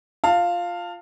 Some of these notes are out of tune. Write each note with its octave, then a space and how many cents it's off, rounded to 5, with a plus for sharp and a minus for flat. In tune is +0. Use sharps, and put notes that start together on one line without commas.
F4 +0 F5 +0 A5 +25